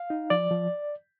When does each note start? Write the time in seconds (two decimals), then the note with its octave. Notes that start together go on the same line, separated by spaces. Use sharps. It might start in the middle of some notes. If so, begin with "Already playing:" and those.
Already playing: F5
0.10 D#4
0.30 F3 D5
0.51 F3